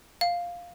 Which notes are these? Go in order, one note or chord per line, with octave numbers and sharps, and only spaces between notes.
F5